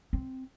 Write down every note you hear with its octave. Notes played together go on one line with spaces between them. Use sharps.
C4